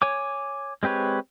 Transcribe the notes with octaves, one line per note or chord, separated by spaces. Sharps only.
C#5 G#5 D6
G#3 C4 G4 B4 C#5